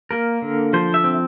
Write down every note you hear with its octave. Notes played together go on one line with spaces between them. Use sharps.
A#3 A#4
D3
F3 C5
E5
C4